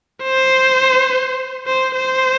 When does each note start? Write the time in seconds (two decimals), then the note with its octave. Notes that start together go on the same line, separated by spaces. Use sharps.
0.23 C5
1.67 C5
1.95 C5